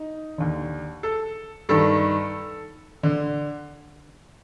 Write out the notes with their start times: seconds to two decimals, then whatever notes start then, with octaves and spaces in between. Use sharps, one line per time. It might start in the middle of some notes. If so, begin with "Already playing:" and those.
Already playing: D#4
0.38 D#2 D3
1.03 A4
1.69 G2 D#3 A4
3.03 D3